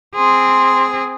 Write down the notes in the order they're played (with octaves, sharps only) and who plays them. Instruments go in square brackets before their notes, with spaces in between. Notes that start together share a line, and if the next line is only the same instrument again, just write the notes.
[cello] C4 G#4 [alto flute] C6